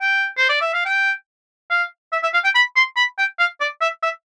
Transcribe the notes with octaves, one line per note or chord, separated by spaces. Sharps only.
G5
C5
D5
E5
F5
G5
F5
E5
E5
F5
G5
B5
C6
B5
G5
F5
D5
E5
E5